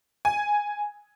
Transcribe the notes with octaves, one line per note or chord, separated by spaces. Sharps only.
G#5